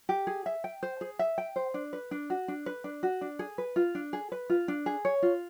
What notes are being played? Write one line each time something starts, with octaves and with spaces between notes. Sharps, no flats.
G4
G#4
E5
G5
C5
G#4
E5
G5
C5
D4
B4
D4
F#4
D4
B4
D4
F#4
D4
G#4
B4
F4
D4
G#4
B4
F4
D4
G#4
C#5
F4